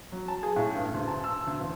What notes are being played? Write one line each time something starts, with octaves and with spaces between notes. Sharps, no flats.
F#3
A5
G#4
A2
G2
D2
A5
E6
D2
A1